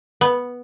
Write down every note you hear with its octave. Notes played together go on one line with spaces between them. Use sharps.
B3